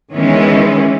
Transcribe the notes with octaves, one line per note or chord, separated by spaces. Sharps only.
D#3 E3 G#3 B3 C#4